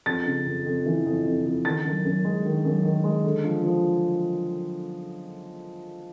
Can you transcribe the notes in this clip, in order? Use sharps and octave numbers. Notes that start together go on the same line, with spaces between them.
F2 A6
C#3
F2
F2
E3
F2
F2
F2
D#3 A6
F#2
F#2
G#3
D#3
F#2
D#3
G#3
D3
F3
F3